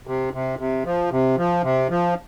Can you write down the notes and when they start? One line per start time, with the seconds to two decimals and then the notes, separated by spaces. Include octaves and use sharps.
0.07 C3
0.33 C3
0.59 C3
0.85 F3
1.11 C3
1.38 F3
1.63 C3
1.90 F3